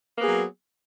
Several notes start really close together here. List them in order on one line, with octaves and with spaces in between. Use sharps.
A#3 B3 G#4 F#3